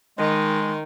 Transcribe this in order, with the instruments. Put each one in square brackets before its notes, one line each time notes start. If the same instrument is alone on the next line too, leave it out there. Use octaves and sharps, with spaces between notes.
[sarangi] D#3 [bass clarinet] G#3